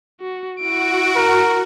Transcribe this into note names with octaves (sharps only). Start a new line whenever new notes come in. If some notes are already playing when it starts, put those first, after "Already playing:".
F#4
E4 F#4 D7
A#4